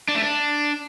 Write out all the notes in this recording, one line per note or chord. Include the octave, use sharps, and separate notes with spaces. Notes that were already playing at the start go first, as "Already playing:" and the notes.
D4
A3
D4